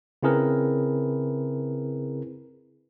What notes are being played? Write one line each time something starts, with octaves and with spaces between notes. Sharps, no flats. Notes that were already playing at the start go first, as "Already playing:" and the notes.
C#3 C4 E4 G#4 A#4 B4